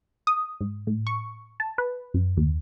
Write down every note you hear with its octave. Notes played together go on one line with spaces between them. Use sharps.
D#6
G#2
A2
C#6
A5
B4
F#2
D#2